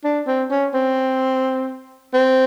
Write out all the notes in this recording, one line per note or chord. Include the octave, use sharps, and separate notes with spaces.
D4
C4
C#4
C4
C4